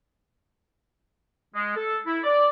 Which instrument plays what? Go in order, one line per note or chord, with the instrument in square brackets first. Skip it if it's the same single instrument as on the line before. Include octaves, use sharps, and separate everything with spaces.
[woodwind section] G#3
A4
E4
D5